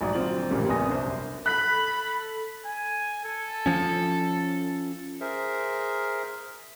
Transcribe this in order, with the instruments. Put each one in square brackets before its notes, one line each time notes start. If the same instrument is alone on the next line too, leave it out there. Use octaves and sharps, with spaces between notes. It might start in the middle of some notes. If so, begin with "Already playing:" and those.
[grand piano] A#1 G#2 F#3 D5 D#6
D3 F#3 C4 F4 F#7
A1 G2 A#2 C#3 G3 G#3
A#1 F#2 B3 G#5 D#6 A#6
C2 D4 C5
F#2
[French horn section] A4 [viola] B5 [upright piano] F#6 B6
[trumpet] G#5
A4
[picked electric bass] F3 C#4
[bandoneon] G#4 A#4 C5 E5